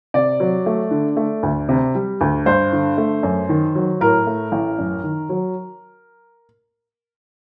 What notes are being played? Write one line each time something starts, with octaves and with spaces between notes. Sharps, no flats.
C3 D5
F#3
A3
D3
A3
D2
C3
G3
D2
G2 C5
D3
A3
F#2
D#3
F#3
A2 A#4
A3
A1
F#2
D#3
F#3